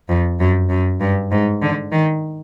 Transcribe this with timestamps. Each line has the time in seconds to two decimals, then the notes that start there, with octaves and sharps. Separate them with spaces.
0.09 F2
0.40 F#2
0.70 F#2
1.01 G2
1.31 G#2
1.62 D3
1.92 D#3